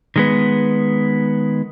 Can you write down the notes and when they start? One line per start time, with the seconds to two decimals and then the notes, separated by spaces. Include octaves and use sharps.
0.16 D#3 G#3 B3